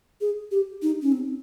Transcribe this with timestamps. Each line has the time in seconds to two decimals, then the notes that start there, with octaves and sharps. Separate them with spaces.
0.21 G#4
0.51 G4
0.82 D#4
1.02 C#4
1.12 C4